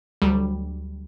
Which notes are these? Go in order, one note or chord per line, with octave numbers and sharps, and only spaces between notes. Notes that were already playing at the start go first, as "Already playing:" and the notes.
D2 F#3 G3